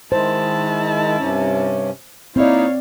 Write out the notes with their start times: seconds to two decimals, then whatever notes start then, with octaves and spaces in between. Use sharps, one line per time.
0.12 D#3 G#3 E4 C5 A5
1.18 G2 C3 C#4
2.36 A#3 C4 D#4 E4 C#5 D5 F5